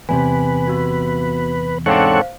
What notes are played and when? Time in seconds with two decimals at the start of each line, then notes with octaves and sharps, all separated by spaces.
0.09 E2 A2 C3 B4 G#5
0.68 B3 F#4
1.86 G#2 C4 D4 A4 C5 C#5 F5 F#5